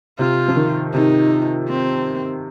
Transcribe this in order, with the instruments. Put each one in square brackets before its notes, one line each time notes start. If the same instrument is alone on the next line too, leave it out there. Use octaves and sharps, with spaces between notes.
[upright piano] C3 [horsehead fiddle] F4
[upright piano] F3
D#3
[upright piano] C3 [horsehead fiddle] D#4
[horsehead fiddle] C4